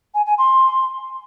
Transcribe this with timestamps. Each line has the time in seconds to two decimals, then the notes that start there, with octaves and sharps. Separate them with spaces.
0.15 G#5
0.26 G#5
0.38 C6